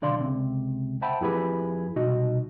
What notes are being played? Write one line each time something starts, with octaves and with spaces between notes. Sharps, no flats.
B1 D3 D5 F5 C6
C#2 C3
C5 E5 F#5 G5 A5 B5
F2 E4 G4 G#4 B4
C2 B2 D#4 F#4 D#5